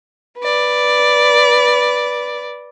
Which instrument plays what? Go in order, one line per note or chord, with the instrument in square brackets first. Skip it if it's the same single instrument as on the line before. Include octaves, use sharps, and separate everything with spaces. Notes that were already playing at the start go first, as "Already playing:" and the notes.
[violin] B4 D5